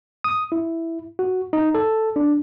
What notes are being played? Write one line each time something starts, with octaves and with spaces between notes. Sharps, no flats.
D#6
E4
F#4
D#4
A4
D4